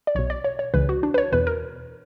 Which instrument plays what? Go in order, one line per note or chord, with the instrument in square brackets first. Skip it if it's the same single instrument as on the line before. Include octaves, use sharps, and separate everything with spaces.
[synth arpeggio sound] D5
B1 B2 C#5
D5
C#5
C#5
C#2 C#3 E3 B4
F#4
D4
B4
C#5
E2 B2 B4
A#4